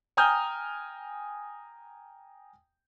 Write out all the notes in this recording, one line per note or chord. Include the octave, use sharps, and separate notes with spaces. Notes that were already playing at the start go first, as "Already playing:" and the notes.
G5 G#5 A#5 D#6 F6 G6